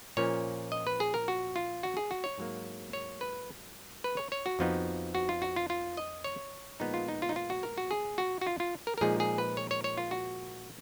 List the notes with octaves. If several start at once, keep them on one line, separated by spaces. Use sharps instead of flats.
A#2 F3 A#3 C#4 C#5
D#5
B4
G#4
A#4
F#4
F4
F#4
G#4
F#4
C#5
G#2 F#3 A#3
C#5
B4
B4
C#5
C#5
F#4
F2 F3 B3 D#4
F#4
F4
F#4
F4
F4
D#5
C#5
A#2 F3 G#3 B3 D#4
F4
D#4
F4
D#4
F4
F#4
A#4
F#4
G#4
F#4
F#4
F4
F4
A#4
A#4
A#2 F3 G#3 D#4 G#4
G#4
B4
C#5
C#5
C#5
F4
F#4